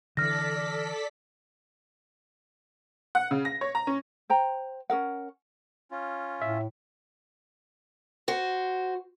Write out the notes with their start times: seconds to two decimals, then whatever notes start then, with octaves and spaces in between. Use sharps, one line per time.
0.17 D3 E3 A4 D5 F6 A#6 B6
3.15 F#5
3.31 C#3
3.45 A#6
3.61 C#5
3.75 A#5
3.87 C#4
4.30 C5 G5 A#5
4.90 C#4 A4 A#4 F#5
5.91 C#4 F4
6.42 A2 E5
8.28 F#4 C5